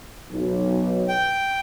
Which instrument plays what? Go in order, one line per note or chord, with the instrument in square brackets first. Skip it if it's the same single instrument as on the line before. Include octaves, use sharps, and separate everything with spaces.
[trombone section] B1
[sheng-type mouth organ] G5